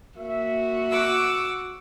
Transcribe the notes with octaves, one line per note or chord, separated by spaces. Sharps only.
A#3 F#4 E5
F#5 D6 E6